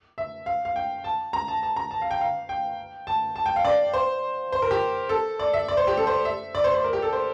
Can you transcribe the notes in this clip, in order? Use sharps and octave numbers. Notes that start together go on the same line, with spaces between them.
E5
F5
F5
G5
A5
A#5
A5
A5
A#5
A5
F5
G5
F5
G5
A5
A5
G5
F5
D5
C5
C5
A#4
G4
A4
D5
E5
D5
C5
G4
A4
C5
E5
D5
C5
C5
A#4
G4
A4
C5